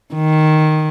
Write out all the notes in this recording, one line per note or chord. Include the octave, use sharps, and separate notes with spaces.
D#3